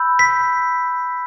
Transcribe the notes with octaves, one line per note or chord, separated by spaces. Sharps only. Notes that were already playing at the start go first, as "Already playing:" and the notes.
Already playing: B5 E6 G6
B6